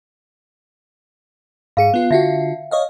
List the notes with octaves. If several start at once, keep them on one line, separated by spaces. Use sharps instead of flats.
G#2 G#4 F5 C#7
B3 F4
D3 F4 F#4 E5
C#5 D#5 F5